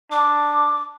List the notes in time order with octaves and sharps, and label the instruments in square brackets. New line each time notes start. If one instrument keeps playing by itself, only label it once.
[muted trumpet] D4 [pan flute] D6